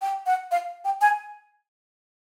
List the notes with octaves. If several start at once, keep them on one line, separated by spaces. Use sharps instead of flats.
G5
F#5
F5
G5
G#5